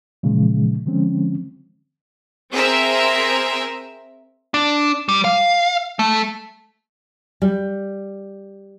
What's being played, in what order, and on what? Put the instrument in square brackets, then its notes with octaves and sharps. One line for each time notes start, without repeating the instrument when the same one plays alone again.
[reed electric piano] A#2 C#3 E3 F3 G#3
D3 F3 G#3 C4 C#4
[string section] C4 G#4 A#4 C5 E5
[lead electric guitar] D4
G3
F5
A3
[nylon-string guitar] G3